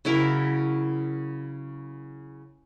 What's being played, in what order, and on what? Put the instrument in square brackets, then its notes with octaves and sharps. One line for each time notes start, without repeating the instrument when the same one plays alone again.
[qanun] C#3 F#3 E4 A#4